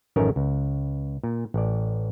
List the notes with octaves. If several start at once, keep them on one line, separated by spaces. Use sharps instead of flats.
A1 F#2 D#3 A3 C#4 A#4
C#2
A#2
A1 D5